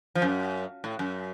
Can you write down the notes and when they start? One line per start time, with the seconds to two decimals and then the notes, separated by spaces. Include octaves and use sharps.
0.15 F3
0.22 F#2
0.84 A2
0.99 F#2